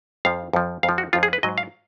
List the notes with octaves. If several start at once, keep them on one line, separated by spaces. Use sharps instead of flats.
F2 F3 F5
F2 F3
F2 F5
F3
F#4
F2 F3 F4
G#4
B4
G#2 F#3 D#5
F5